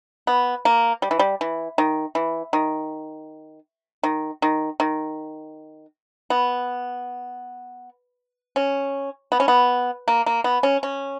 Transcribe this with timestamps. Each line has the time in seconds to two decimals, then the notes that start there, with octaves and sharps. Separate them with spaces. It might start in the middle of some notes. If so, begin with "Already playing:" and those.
0.27 B3
0.65 A#3
1.02 G3
1.11 E3
1.19 G3
1.41 E3
1.78 D#3
2.15 E3
2.53 D#3
4.03 D#3
4.42 D#3
4.80 D#3
6.30 B3
8.56 C#4
9.32 B3
9.40 C#4
9.48 B3
10.08 A#3
10.26 A#3
10.44 B3
10.63 C#4
10.83 C#4